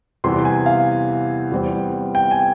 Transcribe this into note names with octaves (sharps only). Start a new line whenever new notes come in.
E2 C3 E3 G3 C6
G#5
F5
E2 E3 G3 C4
G5
G#5